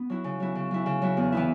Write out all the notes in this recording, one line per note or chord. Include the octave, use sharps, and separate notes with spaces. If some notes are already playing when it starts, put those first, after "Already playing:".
Already playing: B3
F#3 E4
C#3
F#3 E4
C#3
F#3 E4
C#3
F#3 E4
E2
E3 B3 E4